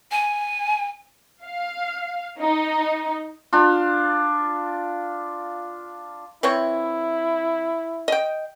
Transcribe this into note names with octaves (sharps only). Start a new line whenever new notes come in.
G#5
F5
D#4
D4 F4
E3 C4 E4 C#5
D#5 G5